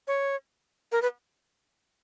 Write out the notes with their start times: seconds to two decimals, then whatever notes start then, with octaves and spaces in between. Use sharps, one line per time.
0.08 C#5
0.92 A#4
1.02 B4